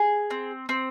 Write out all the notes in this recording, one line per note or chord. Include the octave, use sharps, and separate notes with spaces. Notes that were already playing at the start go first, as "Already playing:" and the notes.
Already playing: G#4
C4
C4